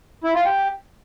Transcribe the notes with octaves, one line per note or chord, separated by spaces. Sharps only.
E4
F4
G4